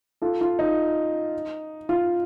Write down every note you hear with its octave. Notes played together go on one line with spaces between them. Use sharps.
F4 A4
F4
D#4
F4